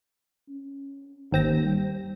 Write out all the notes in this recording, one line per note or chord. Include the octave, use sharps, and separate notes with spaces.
C#4
G#1 D#2 C4 A#6
G3